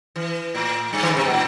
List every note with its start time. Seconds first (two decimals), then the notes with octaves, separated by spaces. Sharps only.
0.16 E3
0.55 A2
0.93 G2
1.02 E3
1.10 D#3
1.17 C3
1.24 B2
1.30 A2